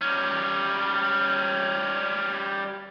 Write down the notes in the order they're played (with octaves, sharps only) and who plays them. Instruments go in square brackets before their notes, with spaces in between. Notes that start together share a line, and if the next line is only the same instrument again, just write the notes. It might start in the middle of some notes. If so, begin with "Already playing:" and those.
[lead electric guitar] G3 C#4